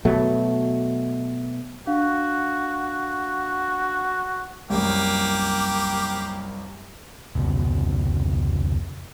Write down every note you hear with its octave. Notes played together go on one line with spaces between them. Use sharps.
B2 F#3 A3
D4 F#4 F5
C2 F#2 A#3 G4
F1 C#2 B2